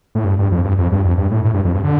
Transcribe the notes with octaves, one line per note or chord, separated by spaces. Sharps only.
A2
G2
G2
F2
G2
F2
G2
F2
G2
A2
A2
G2
F2
G2
D3